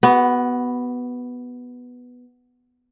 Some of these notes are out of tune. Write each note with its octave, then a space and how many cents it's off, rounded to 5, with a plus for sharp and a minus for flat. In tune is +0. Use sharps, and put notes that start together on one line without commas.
B3 +0 F#4 +35